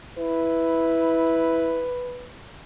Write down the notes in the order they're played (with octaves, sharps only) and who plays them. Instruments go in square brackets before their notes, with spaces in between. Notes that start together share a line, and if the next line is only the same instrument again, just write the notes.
[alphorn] E4 [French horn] B4